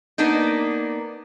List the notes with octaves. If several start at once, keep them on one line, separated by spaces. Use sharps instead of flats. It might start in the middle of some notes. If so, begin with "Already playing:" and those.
A#3 B3 D4 D#4